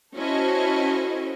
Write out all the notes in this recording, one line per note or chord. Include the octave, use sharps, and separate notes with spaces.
C#4 E4 F#4 A4 C5 D#5